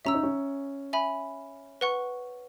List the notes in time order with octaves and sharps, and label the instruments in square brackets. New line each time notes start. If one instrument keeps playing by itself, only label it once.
[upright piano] C#4 [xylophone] E5 A#5 E6
[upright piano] D#4
C#4
[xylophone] E5 G#5 B5
B4 F#5 C#6